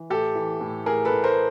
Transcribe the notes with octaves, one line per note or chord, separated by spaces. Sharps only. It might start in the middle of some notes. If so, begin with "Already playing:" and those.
Already playing: E3
A2 G4 A4
E3
A2
A2 G#4 A#4
A4 B4
A2
A#4 C5